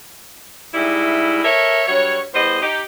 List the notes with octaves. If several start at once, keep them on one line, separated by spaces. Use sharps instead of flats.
G#2 G3 A3 E4
A4 A#4 C#5 E5
G2 F#3 C#5
E2 G3 B3 C5 D#5
D#4 G4